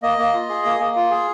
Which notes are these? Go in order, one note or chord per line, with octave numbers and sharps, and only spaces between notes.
A#3 D#5
A#3
F4
G#4
A#3
A#3
F4
G#4